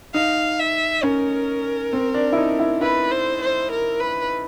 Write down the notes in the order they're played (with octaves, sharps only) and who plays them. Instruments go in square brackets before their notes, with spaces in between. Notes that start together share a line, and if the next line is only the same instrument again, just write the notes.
[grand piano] D#4 [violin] F5
[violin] E5
[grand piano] C#4 [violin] A#4
[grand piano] C4
D4
E4
D#4
E4
[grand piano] E4 [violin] B4
[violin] C5
C5
A#4
B4